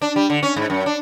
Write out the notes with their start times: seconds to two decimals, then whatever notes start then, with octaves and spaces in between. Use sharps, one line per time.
0.02 D4
0.16 G3
0.30 D3
0.43 C#4
0.56 G#2
0.70 F#2
0.86 D4